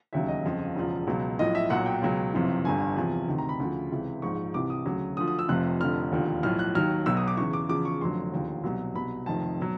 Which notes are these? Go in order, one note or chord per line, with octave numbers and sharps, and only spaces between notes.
E1 D#2 C#3 F#3 E5
D#5
G1 F2 C#3 F3
E1 E2 C#3 F3
C#2 B2 F#3
B1 A2 F3 D#5
E5
B1 A#2 F#3 F#5
G5
C#2 B2 F#3
F#1 F2 C3 E3
G1 G2 D3 G#5
E2 C3 F3
D2 C3 D#3
A#5
B5
D2 C#3 F3
C#2 C3 E3
A#1 G#2 F3 C#6
C2 C3 E3 D6
D#6
D2 C#3 F#3
D2 D3 F3 D#6
D#6
E6
F1 F2 C3 F3 F#6
F1 F2 D3 F3 F6
E1 D#2 D3 F3
B1 A2 F3 F6
F#6
D#2 D#3 F#3 F6
B1 B2 F#3 E6
D#6
D6
E2 C#3 E3 C#6
D6
E2 C#3 F3 D6
C#6
F1 F2 D3 F#3 C6
E1 D#2 D3 F3
C2 B2 F#3
C2 B2 F#3 B5
F1 F2 C3 D#3 A5
B2 F#3